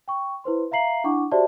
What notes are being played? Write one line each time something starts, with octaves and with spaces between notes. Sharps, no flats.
G5 C#6
E4 B4 C5 C6
E5 F5 A#5 C7 F#7
D4 E4 F#5 C#6 D6
F#4 G4 C5 D5 E5 A5